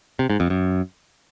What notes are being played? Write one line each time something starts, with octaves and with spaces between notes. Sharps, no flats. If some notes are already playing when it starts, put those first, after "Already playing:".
C3
G#2
F2
F#2